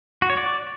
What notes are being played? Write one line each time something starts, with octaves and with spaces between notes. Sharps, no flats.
F#4
C#5
D5